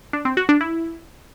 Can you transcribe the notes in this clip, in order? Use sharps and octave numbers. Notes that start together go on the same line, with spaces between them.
D4
C4
F#4
D4
E4